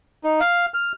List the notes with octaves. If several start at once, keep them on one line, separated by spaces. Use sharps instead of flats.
D#4
F5
F6